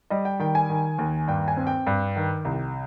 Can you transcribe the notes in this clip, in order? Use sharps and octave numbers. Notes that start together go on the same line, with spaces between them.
G3 D#5
G5
D#3 G5
G#5
D#3
D#2
G2 G5
G#5
C4
G5
G2
D#3
C2